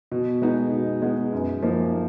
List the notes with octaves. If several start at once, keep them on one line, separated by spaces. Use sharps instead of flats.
B2
G#3 B3 D#4
B2
G#3 B3 D#4
F#2
F3 A#3 D#4